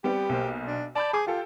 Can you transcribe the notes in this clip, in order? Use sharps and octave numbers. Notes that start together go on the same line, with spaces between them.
G3 B3 C4 G4
B1 A#3 C5
D4
D5 A5 B5 G6
G#4 G#5 D6
F4 G4 A4 G5